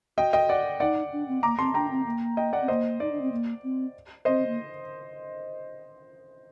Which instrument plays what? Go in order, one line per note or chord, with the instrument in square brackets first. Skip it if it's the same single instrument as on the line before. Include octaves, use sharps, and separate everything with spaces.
[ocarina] F#4 [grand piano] D#5 G5
[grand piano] D#5 G5
D5 F#5
[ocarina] D#4 [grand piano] D5 F#5
[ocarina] D4
C4
[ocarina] A#3 [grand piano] A#5 D6
[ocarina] C4 [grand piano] A5 C6
[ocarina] D4 [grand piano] G5 A#5
[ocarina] C4
A#3
[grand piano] D#5 G5
D5 F#5
[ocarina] C4
[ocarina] A#3 [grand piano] C5 D#5
[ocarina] D#4 [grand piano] D5
[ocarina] D4
C4
A#3
C4
[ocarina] C4 [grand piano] C5 D#5
[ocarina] A#3